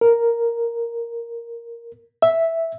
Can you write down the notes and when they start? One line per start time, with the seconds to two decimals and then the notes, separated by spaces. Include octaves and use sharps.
0.01 A#4
2.22 E5